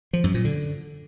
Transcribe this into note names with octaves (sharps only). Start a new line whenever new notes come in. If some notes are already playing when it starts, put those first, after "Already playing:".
F3
F#2
A#2
D3